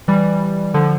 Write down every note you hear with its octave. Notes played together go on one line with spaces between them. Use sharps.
E3 G3
D3 F3